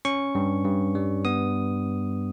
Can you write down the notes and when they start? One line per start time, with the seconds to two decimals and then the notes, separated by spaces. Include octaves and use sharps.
0.05 C#4 C#6
0.35 G2
0.65 G2
0.95 G3
1.25 B3 D#6